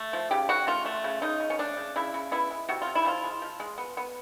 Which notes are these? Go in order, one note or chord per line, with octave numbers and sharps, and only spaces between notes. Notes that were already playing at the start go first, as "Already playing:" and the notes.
Already playing: A3
F3
C#3 G4
C#3 F#4
A3 F4
A3
C#3
C#3 D#4
C#3
C#4
A3 D4
C#3
C#3 E4
C#3
B3 E4
G#3
C3 F#4
C3 F4
E4
F3 F4
G#3
F3
G#3
B3
B3